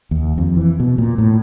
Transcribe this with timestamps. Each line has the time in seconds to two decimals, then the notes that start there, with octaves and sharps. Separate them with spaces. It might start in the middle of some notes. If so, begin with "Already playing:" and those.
0.11 D#2
0.38 F2
0.57 E3
0.80 B2
0.98 A#2
1.18 A2